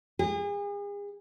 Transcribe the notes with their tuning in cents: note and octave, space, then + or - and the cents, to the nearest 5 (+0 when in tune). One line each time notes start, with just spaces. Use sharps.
G#4 -40